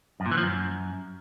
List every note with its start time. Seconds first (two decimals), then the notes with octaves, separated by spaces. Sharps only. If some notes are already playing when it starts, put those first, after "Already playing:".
0.20 F#2
0.26 A#2
0.31 E3
0.37 F3
0.43 F#2